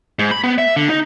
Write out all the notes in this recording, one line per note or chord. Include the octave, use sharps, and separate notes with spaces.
G#2
B5
B3
E5
D3
D#4